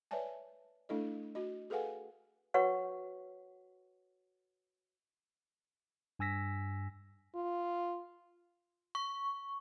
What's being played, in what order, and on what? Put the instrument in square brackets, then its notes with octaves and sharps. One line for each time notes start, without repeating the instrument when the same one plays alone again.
[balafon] B4 C#5 D5 E5 G#5 A5
A3 D4 E4 A4 D#5
F#4 D#5
G#4 A4 B4 F5 F#5 G#5
[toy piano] F#4 B4 C#5 F#5 C#6
[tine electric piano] G2 G#5 E6 A#6 B6
[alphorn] F4
[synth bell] C#6